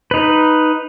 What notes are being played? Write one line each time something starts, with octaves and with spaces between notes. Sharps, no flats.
D#4 B4